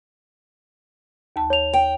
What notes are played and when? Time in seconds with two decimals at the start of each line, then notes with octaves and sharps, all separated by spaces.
1.36 D#2 A5
1.50 C#5 F7
1.73 G5